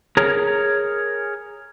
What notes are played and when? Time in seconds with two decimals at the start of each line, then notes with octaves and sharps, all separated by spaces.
0.17 G#4 A#4 C#5 A#5